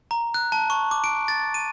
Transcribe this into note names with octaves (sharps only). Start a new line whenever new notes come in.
A#5
F#6
A5
C#6
D6
D7
A6
D#7